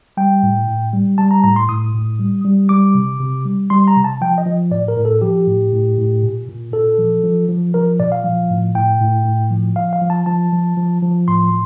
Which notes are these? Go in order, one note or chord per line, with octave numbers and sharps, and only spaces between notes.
G3 G5
A2
A2
G3
G3 A5
A#5
A2 A#5
C6
A2 D#6
A2
G3
G3
G3 D6
C3
C3
G3
G3 C6
A#5
C3
A5
F3 G5
D#5
F3
A2 D5
A#4
A2
A4
F3 G4
A2
A2
A2
A#2
A#2
A#2 A4
F3
F3
F3
F3 A#4
A#2 D5
F5
F3
A2
A2 G5
A2
A2
F3
F3 F5
F5
F3
A5
F3 A5
F3
F3
F3
A2 C6